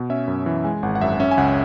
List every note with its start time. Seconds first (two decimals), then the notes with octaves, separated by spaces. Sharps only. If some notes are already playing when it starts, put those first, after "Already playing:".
Already playing: B2
0.10 C#4 E5
0.28 F#2
0.46 E3
0.65 G#3 G#5
0.83 G#1 F#5
0.95 F#5
1.01 F#2 E5
1.20 C#4 E5
1.31 G#5
1.37 C#2 F#5